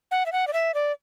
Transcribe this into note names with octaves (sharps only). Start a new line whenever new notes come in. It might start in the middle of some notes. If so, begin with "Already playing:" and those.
F#5
E5
F#5
D5
E5
D5